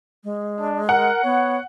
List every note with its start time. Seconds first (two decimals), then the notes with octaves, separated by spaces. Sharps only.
0.24 G#3
0.60 D4
0.89 A#4 F#5
1.24 B3 C#5